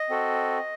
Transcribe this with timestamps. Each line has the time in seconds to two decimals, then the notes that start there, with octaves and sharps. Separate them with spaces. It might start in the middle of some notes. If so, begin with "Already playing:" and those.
Already playing: D#5
0.10 C4 F#4 A4